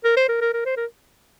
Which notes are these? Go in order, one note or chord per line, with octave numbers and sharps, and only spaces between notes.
A#4
C5
A#4
A#4
A#4
C5
A#4